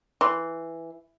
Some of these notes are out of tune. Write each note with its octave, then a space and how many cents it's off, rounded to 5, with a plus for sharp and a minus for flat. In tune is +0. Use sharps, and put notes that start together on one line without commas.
E3 +5 C6 +0